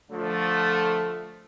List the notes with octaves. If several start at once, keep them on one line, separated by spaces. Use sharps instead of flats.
D3 F3 A3